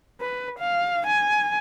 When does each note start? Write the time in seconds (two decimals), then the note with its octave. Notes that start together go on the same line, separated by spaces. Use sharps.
0.21 B4
0.60 F5
1.07 G#5